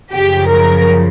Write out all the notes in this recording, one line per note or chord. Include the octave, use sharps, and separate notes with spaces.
F#2 C#3 F3 G4
A#4